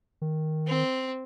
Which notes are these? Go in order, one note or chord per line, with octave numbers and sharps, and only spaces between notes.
D#3
C4